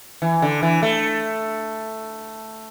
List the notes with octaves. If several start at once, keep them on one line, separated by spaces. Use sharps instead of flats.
E3
D3
E3
A3